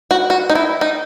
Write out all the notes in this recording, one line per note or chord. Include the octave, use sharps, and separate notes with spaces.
F#4
F#4
D#4
E4
D#4